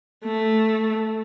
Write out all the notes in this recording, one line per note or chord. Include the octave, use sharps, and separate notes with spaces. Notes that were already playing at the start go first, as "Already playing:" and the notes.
A3